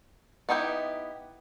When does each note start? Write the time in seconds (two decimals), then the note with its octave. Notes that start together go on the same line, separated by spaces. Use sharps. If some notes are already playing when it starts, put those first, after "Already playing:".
0.49 B3 D#4 E4 G4 G5